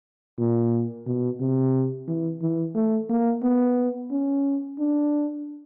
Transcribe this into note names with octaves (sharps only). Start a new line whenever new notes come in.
A#2
B2
C3
E3
E3
A3
A#3
B3
C#4
D4